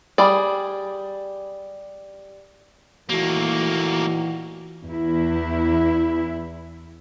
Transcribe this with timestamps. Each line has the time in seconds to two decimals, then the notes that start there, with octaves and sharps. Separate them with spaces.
0.18 G3 G#4 D5
3.10 D#2 A#2 E3 A3 A#3 F#4
4.85 E2 E4